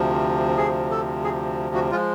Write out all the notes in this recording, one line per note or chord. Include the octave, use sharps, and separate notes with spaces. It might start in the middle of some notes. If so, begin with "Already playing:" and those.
Already playing: D2 C3 F3
G#4
A4
G#4
F#4
F3 G#3 F4